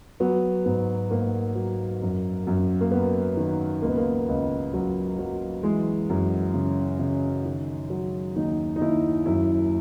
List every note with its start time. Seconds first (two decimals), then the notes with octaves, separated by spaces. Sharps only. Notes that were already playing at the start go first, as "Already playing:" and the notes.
0.20 F#3 B3
0.65 G#2 B3
1.10 G#2 A#3
1.55 F#3
2.02 F#2
2.47 F#2
2.81 A#3
2.91 F#3 B3
3.37 D#3
3.82 C#2 A#3
3.89 B3
3.97 A#3
4.28 C#2
4.73 C#2 F#3
5.19 F#3
5.63 E3 G#3
6.09 F#2
6.54 C#3
6.99 C#3
7.45 D#3
7.90 F#3
8.36 D#2 D#4
8.76 D#4
8.81 D#2 E4
9.26 F#2 E4